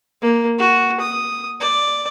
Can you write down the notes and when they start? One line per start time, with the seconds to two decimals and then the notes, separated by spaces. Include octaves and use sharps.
0.22 A#3
0.59 F#4
1.00 D#6
1.61 D5